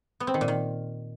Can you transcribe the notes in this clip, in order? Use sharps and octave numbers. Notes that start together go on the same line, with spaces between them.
B3
C4
D#3
A#2
D#3